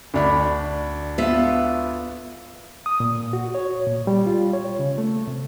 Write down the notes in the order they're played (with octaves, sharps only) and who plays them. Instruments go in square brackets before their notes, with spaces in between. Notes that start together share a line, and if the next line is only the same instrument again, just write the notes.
[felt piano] D2 D4 B5
[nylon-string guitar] B3 F4 E5
[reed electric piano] D#6
A#2
F#4
C#5
A#2
G3
F4
C#5
C#3
A3
C3